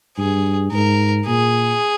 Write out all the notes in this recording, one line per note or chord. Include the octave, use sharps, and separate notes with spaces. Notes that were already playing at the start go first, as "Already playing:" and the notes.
G2 G#4
G#2 A#4
A#2 G#4